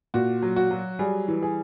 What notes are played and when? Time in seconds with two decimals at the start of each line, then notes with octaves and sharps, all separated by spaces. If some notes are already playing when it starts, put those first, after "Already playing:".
0.14 A#2 F#4
0.42 F#3
0.56 F#4
0.71 F#3
0.99 G3 G#4
1.28 E3
1.42 G#4